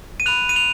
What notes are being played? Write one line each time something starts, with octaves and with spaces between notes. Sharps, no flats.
D#7
B5 F#6 F7
D#7
F7